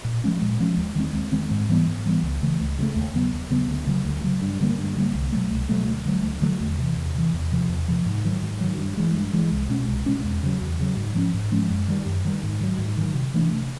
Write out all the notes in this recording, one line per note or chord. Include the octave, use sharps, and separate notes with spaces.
A#2
F3 G#3 C#4
A#2
F3 G#3 C#4
D#2
D#3 G#3 C4
D#2
D#3 G#3 C4
G#2
E3 G3 B3
G#2
E3 G3 B3
C#2
C#3 E3 A3
C#2
C#3 E3 A3
D#2
C#3 F#3 B3
D#2
C#3 F#3 B3
D2
C#3 F#3
D2
C#3 F#3
G2
D3 G3 A#3
G2
D3 G3 A#3
C2
B2 F#3 A3
C2
B2 F#3 A3
D2
D3 F#3 A3
D2
D3 F#3 A3
E2
C3 E3
E2
C3 E3
E2
C3 F3
E2
C3 F3
G#2
D#3 F#3
G#2
D#3 F#3
G2
E3 G#3
G2
E3 G#3
C2
B2 G#3 C#4
C2
B2 G#3 C#4
E2
C#3 F#3
E2
C#3 F#3
G#2
F3 G#3 C#4
G#2
F3 G#3 C#4
F#2
D#3 G3
F#2
D#3 G3
G#2
D#3 F#3
G#2
D#3 F#3
C3
E3 A3 D4
C3